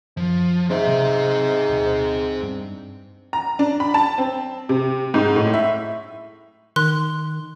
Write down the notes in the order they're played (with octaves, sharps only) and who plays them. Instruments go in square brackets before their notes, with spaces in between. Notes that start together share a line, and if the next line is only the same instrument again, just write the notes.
[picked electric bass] F#2 [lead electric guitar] F3
[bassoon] G#2 [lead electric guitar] C4 E5
[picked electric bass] C3 F#3
D2 B2
G2
[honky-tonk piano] A#5
D4
B5
A5
C4
C3
G#2
A2
E5
[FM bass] D#3 [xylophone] C6 F#6